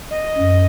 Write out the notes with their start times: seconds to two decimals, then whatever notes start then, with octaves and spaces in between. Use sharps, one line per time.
0.10 D#5
0.38 F#2